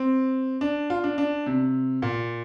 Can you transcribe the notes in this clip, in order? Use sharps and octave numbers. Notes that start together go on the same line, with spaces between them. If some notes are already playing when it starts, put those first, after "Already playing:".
Already playing: C4
D4
F4
D4
D4
C3
A#2